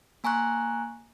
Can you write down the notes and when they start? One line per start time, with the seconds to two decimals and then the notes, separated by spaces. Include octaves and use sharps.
0.24 A#3 G#5 A#5 C#6 F#6